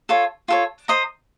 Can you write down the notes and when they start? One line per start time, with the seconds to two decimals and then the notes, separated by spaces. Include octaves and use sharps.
0.09 F4 A4 C#5
0.48 F4 A4 C#5
0.88 C5 D#5 A#5 D#6